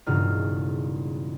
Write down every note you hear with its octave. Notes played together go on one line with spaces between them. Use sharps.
E1 G2 C#3 D#4 F4 F6